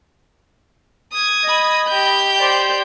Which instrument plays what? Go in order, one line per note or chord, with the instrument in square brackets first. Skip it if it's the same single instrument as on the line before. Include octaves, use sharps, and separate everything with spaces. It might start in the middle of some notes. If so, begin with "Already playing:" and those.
[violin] D#6 G#6
[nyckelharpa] D#5 B5
[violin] G4 G6
[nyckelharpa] C5 D5